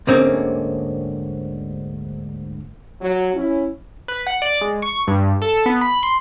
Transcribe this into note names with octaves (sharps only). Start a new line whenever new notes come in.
D2 G#2 D3 A#3 C4 C#4
F#3
C#4 E4
B4
F#5
D5
G#3
C#6
G2
A4
B3
B5
C6